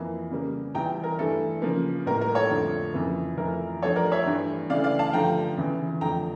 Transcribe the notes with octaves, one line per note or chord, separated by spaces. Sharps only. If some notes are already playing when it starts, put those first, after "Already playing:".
Already playing: F2 E3 A#3
C#3 G3 A#3
E2 E3 G3 G5 A#5
A#4
G2 E3 A3 A4
C#3 F3 A#3
A2 G3 A#3 A#4
A#4
A4 C#5
F2 D3 F3 A3
F2 C#3 E3 A#3
F2 E3 A3 A#4
G2 F3 A3 A4 C#5
A#4 D5
C#5 E5
G2 E3 A3
C#3 E3 A3 D5 F5
D5 F5
F5 A5
G2 D3 F3 A3 G5 A#5
E2 C#3 E3
F2 D3 A3 G5 A#5